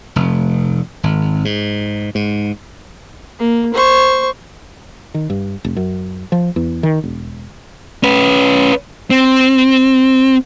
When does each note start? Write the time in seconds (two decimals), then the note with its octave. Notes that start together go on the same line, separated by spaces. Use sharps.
0.16 F1
1.03 G#1
1.45 G#2
2.15 G#2
3.39 A#3
3.74 C5 C#6
5.14 D#3
5.30 G2
5.64 F1
5.77 F#2
6.32 F3
6.56 E2
6.83 D#3
7.04 E1
8.03 C#4 B4
9.10 C4